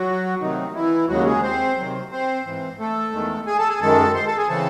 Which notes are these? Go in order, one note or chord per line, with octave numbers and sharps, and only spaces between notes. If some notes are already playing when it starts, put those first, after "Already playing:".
Already playing: F#3 F#4
C3 D#3 F#3 A3 C4 D#4
E3 E4
D#2 C#3 F#3 G#3 F#4
G#3 G#4
C4 C5
C3 D#3 F#3 C4
C4 C5
G#2 E3 C4
A3 A4
E2 D#3 G#3
G#4 G#5
A4 A5
G#4 G#5
F#2 D#3 G#3 A4 A5
C5 C6
A4 A5
G#4 G#5
C#3 E3 C4 A4 A5